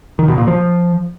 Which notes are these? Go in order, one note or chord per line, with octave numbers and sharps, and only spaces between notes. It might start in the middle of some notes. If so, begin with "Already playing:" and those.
D#3
B2
A#2
F3